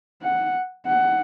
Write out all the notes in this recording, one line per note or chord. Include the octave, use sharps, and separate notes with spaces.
F#5
F#5